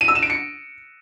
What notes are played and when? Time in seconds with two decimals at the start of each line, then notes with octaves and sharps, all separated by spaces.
0.01 D#7
0.08 E6
0.15 E7
0.22 D7
0.30 C#7